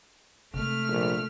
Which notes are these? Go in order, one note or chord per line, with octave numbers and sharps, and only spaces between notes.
C3 G#3 A3 F6
A#1